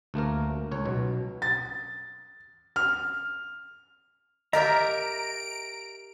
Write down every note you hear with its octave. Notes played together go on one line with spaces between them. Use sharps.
D2 A3 A#3 A#4
C#2 C#5
B1 B2
A6
F6
G4 A#4 D#5 E5 A#5 D7